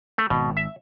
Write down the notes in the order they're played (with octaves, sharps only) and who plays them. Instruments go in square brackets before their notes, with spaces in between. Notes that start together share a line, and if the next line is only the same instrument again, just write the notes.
[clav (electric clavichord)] A3
[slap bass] G#1 [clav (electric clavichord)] B2
[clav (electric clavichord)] E5